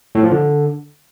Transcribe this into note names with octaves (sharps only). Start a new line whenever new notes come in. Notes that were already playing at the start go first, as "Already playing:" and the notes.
A2
F3
D3